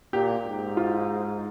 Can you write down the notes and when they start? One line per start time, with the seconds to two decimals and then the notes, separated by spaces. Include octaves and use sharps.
0.13 A#2 G4
0.46 G#2
0.77 F4